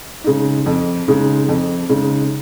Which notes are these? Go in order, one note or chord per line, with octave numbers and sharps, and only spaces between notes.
C#3 G#3 D#4
F2
C#3 G#3 D#4
F2
C#3 G#3 D#4